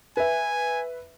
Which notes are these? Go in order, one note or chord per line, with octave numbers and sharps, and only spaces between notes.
B4 E5 G#5